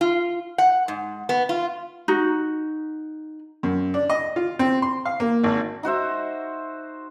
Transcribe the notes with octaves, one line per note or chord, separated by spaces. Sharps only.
F4
F#5
G#2
B3
F4
D#4 F#4
F#2
D4
D#5
F4
C4
C6
F5
A#3
G#1
D#4 F#4 C5 E5